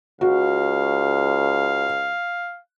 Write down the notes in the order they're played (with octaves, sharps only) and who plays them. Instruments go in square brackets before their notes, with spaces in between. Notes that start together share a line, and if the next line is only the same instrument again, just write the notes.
[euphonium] C#2 [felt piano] F#4 [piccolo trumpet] F5